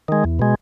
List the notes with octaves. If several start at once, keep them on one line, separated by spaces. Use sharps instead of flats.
D#3 G#3
E2
B2 G#3